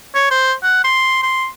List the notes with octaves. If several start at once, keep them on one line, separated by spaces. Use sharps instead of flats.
C#5
C5
F#5
C6
C6